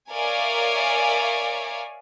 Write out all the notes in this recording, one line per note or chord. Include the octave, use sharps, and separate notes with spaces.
A#4 C#5 D5 E5 F5 G#5